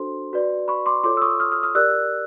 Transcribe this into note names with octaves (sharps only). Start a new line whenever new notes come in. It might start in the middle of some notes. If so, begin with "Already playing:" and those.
Already playing: D4 F#4 A4 C5 C6
F#4 B4 D5
B5 C#6
C6 D6
F4 A4 C#5 C6 D6
E6
C#6 D#6
D#6 F6
D#6 F6
D#6 F6
G4 A#4 D5 E6 F#6